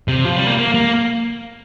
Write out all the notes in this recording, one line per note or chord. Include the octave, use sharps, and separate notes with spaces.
C3
F3
G3
A#3
A#3
A#3